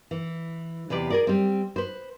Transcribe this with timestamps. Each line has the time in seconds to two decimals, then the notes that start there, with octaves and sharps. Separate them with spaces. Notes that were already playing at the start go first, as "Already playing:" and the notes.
0.11 E3
0.90 E2 C3 B4 D5
1.10 G#4 A#4 D5
1.27 G3 C4
1.76 B4 C5